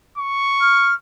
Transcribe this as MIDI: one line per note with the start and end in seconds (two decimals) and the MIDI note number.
0.18 0.95 85
0.60 0.94 89